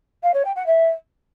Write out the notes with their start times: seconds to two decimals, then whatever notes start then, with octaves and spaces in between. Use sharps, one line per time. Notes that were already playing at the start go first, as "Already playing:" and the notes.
0.23 F5
0.34 C#5
0.45 G5
0.56 F#5
0.66 E5